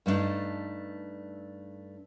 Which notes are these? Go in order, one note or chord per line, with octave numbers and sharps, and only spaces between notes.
G2 A3 A#3 D4 D#4